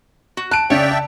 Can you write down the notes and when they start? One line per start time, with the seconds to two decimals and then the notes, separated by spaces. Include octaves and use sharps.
0.37 F#4
0.51 A5 F#6 D7
0.70 C#3 C#5 D5 E5 G5
0.91 A5